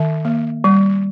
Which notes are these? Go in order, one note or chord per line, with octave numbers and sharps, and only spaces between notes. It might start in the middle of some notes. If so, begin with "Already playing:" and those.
Already playing: D#3 E5
A#3
G3